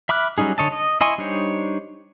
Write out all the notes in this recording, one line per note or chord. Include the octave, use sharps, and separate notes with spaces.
E5 B5 D6 F6 F#6
F#3 G3 C#4 D#4 G#4
D3 C#5 D#5 A5
D#5
E4 D#5 G#5 C6 C#6
G3 D4 D#4 C5 C#5